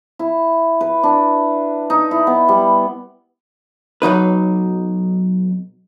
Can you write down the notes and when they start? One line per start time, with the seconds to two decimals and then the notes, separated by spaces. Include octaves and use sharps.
0.19 E4
0.81 B4
1.03 D4
1.90 D#4
2.11 E4
2.27 B3
2.49 G3
4.02 B1 F#3 D#4 B4